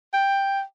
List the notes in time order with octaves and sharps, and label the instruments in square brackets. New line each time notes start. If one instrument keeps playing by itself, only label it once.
[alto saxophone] G5